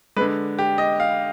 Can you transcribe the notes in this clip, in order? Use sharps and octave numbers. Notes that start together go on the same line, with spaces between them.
D3 G#3 B4
G4
D#5
F5